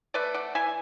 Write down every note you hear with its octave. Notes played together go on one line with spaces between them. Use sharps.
A3 B4 D5
D5 F#5
E3 E5 G#5